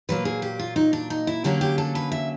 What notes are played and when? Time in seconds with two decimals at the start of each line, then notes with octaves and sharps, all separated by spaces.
0.09 A#2 F#3 A#3 B4
0.25 G#4
0.42 G4
0.59 F4
0.76 D#4
0.93 D4
1.10 D#4
1.27 E4
1.44 D3 F#3 A#3 C#4 G4
1.61 G4
1.78 A4
1.95 B4
2.12 E5